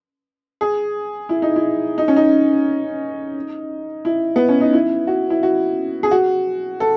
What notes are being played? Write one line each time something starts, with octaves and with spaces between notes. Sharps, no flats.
G#4
E4
D#4
E4
D#4
C#4
D#4
E4
B3
C#4
D#4
E4
F#4
E4
F#4
G#4
F#4
A4